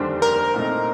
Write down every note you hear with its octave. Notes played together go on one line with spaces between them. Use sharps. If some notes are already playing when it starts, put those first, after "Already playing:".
Already playing: F1 D#2 D3 G3 D4 C5
A#4
C2 A#2 A3 C4 D#4